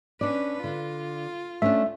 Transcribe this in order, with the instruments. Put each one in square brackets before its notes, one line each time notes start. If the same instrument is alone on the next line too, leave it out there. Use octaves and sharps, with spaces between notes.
[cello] C#4 B4 [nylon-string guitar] D4 D5
[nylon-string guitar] D3 [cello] F4
[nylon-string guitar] A3 C#4 D4 [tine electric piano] E5